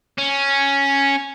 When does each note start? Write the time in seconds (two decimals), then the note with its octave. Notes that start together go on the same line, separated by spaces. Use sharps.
0.18 C#4